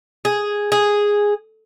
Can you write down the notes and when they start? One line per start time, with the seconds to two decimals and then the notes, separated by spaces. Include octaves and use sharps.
0.25 G#4
0.72 G#4